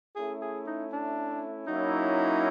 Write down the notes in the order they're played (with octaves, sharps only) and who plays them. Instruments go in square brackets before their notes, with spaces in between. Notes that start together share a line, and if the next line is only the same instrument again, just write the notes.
[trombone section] A3 C#4 E4 [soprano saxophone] G#4
[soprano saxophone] G#4
D#4
D4
[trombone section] F#3 A#3 C#4 E4 [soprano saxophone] D#4